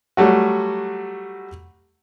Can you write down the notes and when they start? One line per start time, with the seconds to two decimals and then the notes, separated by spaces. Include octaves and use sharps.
0.17 F#3 G3 A3 F#4